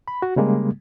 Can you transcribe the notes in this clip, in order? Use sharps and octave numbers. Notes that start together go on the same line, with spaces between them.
B5
F#4
C#3 G3 G#3 A#3